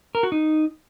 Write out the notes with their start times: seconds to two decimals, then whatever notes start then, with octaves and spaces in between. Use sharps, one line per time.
0.15 A#4
0.23 F#4
0.32 D#4